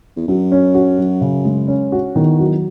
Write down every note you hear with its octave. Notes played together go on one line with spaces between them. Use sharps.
E2
F#2 F#3
C#4
F#4
F#3
C#3
G#3
C#4
F#4
E2 D#3
F#3